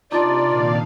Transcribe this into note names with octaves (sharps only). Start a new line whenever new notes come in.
C3 D4 D#4 F4 D5
A#2 D#3 F5